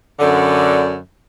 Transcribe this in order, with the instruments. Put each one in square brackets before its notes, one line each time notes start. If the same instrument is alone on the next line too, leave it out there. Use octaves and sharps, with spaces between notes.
[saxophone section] F#2 D3